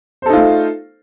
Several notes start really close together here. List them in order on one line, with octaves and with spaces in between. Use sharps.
C5 A4 D#4 F4 A3